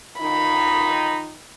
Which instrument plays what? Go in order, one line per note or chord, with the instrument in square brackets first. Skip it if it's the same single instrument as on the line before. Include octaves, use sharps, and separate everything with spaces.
[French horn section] D#3 D#4 F4 [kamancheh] B5